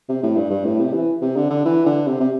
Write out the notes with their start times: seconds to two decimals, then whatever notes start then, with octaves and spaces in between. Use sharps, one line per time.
0.09 C3
0.23 A2
0.36 G2
0.50 G2
0.65 A2
0.80 C3
0.93 E3
1.21 C3
1.36 D3
1.50 D3
1.65 E3
1.86 D3
2.07 C3
2.20 C3